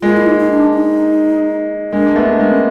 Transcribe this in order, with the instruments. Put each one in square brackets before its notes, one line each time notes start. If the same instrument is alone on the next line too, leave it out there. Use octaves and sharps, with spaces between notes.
[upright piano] G#3 A#3 [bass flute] F4
[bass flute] E4
D#4
D#4
D4
D#4
[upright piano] G#3 A#3 [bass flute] D4
[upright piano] A#3
A3 B3
[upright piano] G#3 A#3 [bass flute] D4
[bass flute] C#4